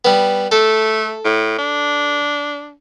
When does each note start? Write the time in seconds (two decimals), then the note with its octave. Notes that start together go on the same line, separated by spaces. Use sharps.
0.05 G3 B3
0.52 A3 A4
1.25 A2
1.58 D4